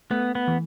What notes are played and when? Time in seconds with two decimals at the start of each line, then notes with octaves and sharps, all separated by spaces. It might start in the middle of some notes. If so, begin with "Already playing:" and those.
0.10 A3 B3
0.35 B3
0.48 E3